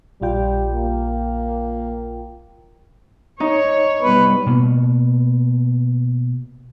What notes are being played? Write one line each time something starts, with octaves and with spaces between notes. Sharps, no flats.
A#1 G3 F4 G5
A#3
D#4 C#5
C3 G3 B3 B4
B2 A#3